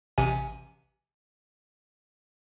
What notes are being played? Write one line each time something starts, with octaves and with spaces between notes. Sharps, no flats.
A1 C3 G#5